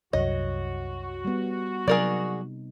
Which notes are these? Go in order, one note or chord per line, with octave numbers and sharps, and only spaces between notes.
C2 F#2 F#4 C#5 D#5
G3 B3
C3 F#3 D#4 G#4 A#4 D5